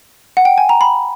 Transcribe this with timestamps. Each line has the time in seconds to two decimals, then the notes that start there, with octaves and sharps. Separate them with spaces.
0.37 F#5
0.45 G5
0.58 G#5
0.69 A#5
0.81 B5